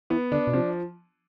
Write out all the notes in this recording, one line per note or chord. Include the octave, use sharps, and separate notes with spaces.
E3 B3
D3 D4
B2
C3 F3